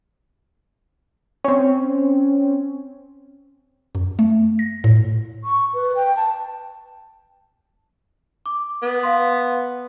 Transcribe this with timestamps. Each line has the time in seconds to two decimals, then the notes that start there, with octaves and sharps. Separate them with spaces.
1.44 C4 C#4
3.95 F#2
4.19 A3
4.59 A#6
4.84 A2
5.44 C#6
5.74 B4
5.96 G5
6.16 A5
8.46 D6
8.83 B3
9.03 F5 C6